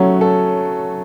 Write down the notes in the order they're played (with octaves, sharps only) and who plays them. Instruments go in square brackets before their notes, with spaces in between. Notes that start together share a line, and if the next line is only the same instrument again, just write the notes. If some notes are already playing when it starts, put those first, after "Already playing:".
Already playing: [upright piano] F#3 [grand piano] A3 C#4
[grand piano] A4